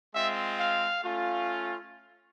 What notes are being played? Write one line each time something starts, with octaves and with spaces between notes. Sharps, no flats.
G#3 C4 F4 E5
F5
A3 C#4 F4